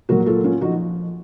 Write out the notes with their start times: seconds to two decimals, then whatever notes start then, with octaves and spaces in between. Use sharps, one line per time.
0.09 A#2 F#3 F#4 A#4
0.20 F#4
0.26 F4 A4
0.44 C#4 F4
0.61 F3 D#4 F#4